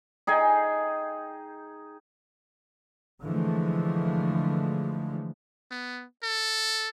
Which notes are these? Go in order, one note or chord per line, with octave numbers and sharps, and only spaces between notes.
D#4 G#4 G5 G#5
D3 E3 F3 G#3 A3
B3
A4